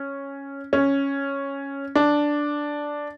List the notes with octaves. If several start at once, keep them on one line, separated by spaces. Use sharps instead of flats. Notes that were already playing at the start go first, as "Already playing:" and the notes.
Already playing: C#4
C#4
D4